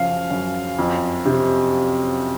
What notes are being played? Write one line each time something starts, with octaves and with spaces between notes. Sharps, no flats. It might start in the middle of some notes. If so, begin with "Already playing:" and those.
Already playing: F#2 C#3 F3 F5
F#2
F2
C3